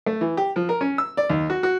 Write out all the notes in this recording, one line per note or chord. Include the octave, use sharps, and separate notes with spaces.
A3
E3
G4
F3
A#4
C#4
E6
D5
D#2
F#4
F#4